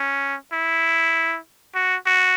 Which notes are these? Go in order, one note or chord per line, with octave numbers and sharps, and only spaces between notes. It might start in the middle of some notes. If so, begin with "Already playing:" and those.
Already playing: C#4
E4
F#4
F#4